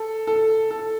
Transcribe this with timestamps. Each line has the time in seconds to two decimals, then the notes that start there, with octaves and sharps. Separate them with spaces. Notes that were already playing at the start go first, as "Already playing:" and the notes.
Already playing: A4
0.27 A4
0.71 A4